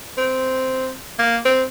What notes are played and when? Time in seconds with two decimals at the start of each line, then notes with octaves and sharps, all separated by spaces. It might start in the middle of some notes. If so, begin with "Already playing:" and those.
0.18 C4
1.19 A#3
1.46 C4